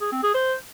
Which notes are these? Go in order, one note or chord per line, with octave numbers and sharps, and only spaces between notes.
G#4
C4
G#4
C5